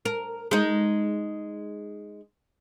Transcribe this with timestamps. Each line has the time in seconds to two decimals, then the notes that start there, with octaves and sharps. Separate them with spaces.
0.05 A#4
0.51 G#3 D#4